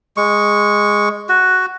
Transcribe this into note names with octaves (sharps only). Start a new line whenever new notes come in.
G#3 C#6
F#4